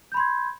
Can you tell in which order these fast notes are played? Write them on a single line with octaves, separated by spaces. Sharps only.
G6 B5 C6 G#6